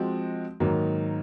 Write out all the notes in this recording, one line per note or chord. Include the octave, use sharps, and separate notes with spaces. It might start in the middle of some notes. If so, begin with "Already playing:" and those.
Already playing: F3 G#3 C4 F#4
G#2 D#3 F#3 A#3